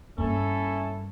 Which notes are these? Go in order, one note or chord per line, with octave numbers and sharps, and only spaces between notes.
G2 A#3 C#4 E4 A4